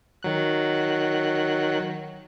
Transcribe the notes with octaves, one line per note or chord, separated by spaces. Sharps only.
D#3 F#3 F#6